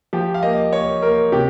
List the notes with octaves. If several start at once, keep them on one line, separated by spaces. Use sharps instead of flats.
F3 G4
F5
A#3 D#5
A#3 C#5
A#3 A#4
C3 G4